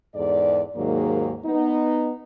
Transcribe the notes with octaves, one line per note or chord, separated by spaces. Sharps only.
E2 G#2 A4 D5
D#2 G#2 D#3 F#3 A#3 G#4
B3 D#4